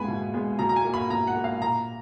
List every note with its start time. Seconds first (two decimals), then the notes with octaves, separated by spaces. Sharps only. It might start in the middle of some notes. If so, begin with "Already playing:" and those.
Already playing: G#3 B3 G#5 B5
0.08 B2
0.34 G#3 B3
0.59 B2 A#5
0.69 A#5
0.76 G#5
0.85 A#3
0.94 B5
1.10 B2 A#5
1.27 F#5
1.36 A#3
1.44 F5
1.61 A#2 A#5